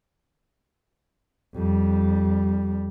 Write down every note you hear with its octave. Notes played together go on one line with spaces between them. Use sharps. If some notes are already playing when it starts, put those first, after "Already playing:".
F2 G3